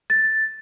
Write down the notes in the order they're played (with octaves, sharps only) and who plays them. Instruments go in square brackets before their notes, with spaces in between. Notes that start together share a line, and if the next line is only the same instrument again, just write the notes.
[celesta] A6